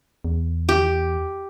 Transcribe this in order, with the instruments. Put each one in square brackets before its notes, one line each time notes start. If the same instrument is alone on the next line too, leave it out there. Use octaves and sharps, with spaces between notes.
[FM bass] E2
[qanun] G4